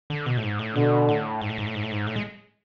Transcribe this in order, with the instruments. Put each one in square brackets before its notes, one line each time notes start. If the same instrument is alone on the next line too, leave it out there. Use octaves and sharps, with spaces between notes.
[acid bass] D3
B2
A2
G#2
A2
[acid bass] B2 [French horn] D3
[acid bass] A2
G#2
A2
G#2
A2
G#2
A2
G#2
A2
G#3